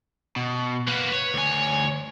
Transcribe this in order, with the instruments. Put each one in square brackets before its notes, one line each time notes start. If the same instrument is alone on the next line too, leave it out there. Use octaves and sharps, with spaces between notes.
[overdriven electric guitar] B2
[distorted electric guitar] A#3 F#4 [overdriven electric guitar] B4
[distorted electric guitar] C#5
[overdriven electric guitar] D2 G#5